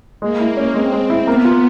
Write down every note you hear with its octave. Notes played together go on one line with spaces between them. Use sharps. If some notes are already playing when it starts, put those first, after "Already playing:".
G#3 A#3
E4
C#4
G#3 C4
G#3
E4
A#3 B3
F4